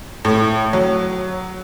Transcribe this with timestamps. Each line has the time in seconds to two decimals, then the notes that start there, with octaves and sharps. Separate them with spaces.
0.25 A2
0.73 F#3